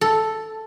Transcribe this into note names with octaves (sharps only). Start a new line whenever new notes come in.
A4